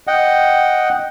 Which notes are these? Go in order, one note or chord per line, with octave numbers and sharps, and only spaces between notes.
D#5 F#5 G5